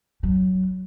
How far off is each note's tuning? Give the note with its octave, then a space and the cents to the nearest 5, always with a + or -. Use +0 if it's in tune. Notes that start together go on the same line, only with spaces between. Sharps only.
F#3 +15